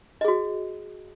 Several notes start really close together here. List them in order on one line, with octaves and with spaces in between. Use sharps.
D#5 G#4 F#4